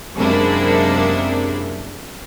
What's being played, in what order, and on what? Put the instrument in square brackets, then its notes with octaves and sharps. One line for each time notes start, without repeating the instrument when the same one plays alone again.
[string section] F#2 C3 G#3 A#3 D4 E4